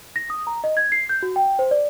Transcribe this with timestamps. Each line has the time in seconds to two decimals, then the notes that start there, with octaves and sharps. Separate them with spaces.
0.16 A#6
0.30 D#6
0.47 A#5
0.64 D#5
0.77 G#6
0.92 C7
1.09 G6
1.23 F#4
1.36 G5
1.59 C5
1.71 D5